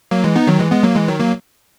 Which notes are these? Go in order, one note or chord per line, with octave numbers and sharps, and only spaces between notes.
F#3 A#3
E3 G#3
B3 D#4
D#3 F#3
E3 G#3
G#3 B3
F#3 A#3
E3 G#3
D#3 F#3
F#3 A#3